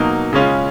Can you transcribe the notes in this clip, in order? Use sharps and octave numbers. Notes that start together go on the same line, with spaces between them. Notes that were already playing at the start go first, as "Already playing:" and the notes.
Already playing: B2 F#3 A#3 D#4
C#3 G#3 C#4 F4